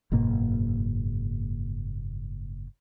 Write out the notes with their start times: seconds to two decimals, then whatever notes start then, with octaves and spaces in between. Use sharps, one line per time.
0.12 F#1 G#2 B2 A#3